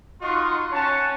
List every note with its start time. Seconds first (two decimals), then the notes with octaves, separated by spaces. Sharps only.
0.22 D#4 F4 F#4 D#5 C6 C#6
0.72 C#4 C#5 F#5 A5